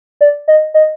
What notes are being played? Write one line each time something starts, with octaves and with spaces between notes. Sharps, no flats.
D5
D#5
D#5